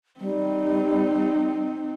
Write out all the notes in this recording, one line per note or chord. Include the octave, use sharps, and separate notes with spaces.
G3 C4 D#4